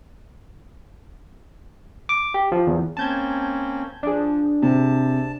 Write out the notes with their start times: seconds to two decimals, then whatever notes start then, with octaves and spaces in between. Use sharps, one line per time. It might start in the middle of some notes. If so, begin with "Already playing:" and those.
2.09 D6
2.34 G4
2.52 F3
2.67 E2
2.97 A#3 C4 C#4 A5 G6 G#6
4.03 F3 D4 G#4
4.62 C3 A5